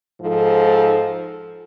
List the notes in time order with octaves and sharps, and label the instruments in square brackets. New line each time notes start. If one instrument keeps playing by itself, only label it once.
[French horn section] G#2 F3 A4